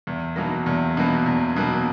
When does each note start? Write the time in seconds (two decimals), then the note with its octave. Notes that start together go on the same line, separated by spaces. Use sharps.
0.07 E2
0.36 B2 F#3 A#3
0.66 E2
0.97 B2 F#3 A#3
1.26 E2
1.56 B2 F#3 A#3